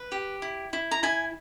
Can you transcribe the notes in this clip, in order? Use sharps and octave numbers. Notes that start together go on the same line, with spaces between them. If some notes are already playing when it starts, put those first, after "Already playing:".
Already playing: B4
G4
E4
E4
A#5
E4 G#5